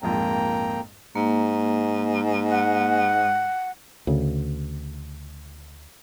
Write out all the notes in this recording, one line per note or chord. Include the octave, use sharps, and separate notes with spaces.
A#1 F2 G#2 A#3 G5 A#5
G#2 A#3
F#5
D2 C#3